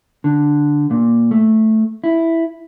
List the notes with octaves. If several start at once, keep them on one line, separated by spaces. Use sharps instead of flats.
D3
A#2
A3
E4